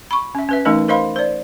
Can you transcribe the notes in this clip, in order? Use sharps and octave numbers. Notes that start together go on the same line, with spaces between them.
B5 C#6
C#4 E5
C#4 B4 E5
E3 A3 C#4 D#4 A#4 D#5
A#4 C5 D#5 F5 B5 C6
C5 D5